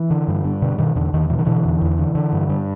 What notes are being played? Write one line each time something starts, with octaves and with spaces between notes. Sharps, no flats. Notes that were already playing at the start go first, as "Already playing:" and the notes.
Already playing: E3
D3
G2
G2
B2 D3
B2 D#3
E2 D3
E2 D#3
B2 E3
D#3
B2 D3 E3
E2
E2
D3
D3
G2
G2